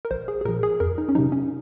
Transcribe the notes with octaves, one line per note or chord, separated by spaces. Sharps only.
A#4
A#1 C5
G#4
G#4
A#2 F3 A#4
G#4
F2 A#4
D#4
C#4
C3 F#3 D#4
C#4